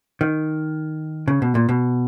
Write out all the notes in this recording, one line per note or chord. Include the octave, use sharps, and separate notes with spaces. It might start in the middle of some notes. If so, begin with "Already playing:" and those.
D#3
C#3
B2
A#2
B2